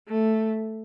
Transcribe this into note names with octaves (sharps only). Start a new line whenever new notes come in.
A3